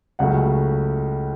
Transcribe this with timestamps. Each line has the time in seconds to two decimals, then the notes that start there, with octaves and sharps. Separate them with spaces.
0.19 C#2 C#3 F#3 A3 F#5